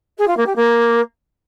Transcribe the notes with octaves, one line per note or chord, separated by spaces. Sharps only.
G#4
F4
A#3
G4
A#3